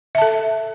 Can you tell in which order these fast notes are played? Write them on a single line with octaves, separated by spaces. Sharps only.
E5 A5 A4